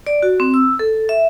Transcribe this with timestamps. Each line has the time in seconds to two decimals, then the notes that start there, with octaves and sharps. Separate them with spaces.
0.07 D5
0.23 F#4
0.40 C4
0.54 E6
0.79 A4
1.09 E5